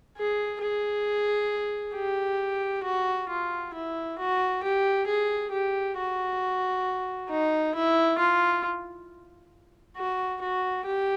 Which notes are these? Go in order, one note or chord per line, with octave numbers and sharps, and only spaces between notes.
G#4
G#4
G4
F#4
F4
E4
F#4
G4
G#4
G4
F#4
D#4
E4
F4
F#4
F#4
G4